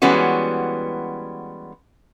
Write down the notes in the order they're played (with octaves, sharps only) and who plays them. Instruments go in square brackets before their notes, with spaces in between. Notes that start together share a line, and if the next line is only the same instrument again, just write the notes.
[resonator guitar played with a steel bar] E3 G3 G#3 B3 C#4 F#4